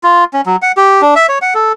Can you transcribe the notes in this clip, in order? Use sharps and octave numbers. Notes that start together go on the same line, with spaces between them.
F4
C#4
F#3
F#5
G4
D4
E5
C#5
F#5
A4